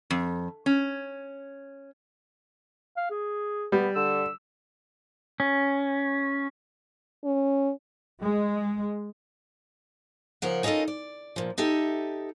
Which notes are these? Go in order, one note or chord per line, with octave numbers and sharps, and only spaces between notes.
F2
C#4
F5
G#4
G3 B3
D3 E6
C#4
C#4
G#3
C#3 F3 A#4 F#5
C#4 D#4 F4 A4 A#4 D#5
D5
A#2 F3
D#4 G4 A4 E5